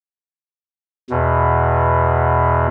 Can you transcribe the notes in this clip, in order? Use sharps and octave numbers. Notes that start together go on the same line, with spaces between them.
E2 B2